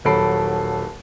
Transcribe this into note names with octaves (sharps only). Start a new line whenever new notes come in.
D#1 F#3 A4 B5 C7 D7